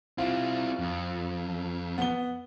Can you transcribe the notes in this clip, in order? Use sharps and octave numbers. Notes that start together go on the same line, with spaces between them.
C4 E4 F4
F2
B3 G7